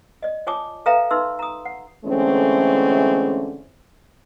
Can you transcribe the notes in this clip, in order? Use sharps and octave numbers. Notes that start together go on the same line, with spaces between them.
D5 D#5
F4 C#5 G#5 A5 D6 D#6
A4 B4 E5 F5 G5 A#5
D#4 B4 E5 C6 E6
A#5 D#6
F#5
D3 E3 G#3 A3 C4 C#4